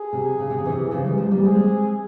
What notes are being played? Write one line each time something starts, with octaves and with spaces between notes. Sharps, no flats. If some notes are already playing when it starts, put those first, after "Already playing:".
Already playing: G#4
C3
C#3
C3
C#3
C3 E3
C#3 F3
E3 G3
F3 G#3
G3 A#3
G#3 C4 G#4